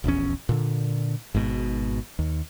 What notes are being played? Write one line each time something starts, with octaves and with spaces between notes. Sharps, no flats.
D#1 A#1 E2 C#4
A#2 D3
G#1 G#2 B2
D#2